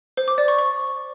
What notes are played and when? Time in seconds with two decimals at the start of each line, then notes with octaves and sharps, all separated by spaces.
0.17 C5
0.28 D6
0.38 D5
0.48 C#6
0.58 C#6